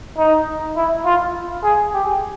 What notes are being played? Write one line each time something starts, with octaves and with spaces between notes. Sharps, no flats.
D#4
E4
F4
G#4
G4